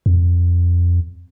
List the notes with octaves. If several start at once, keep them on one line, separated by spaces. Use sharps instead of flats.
F2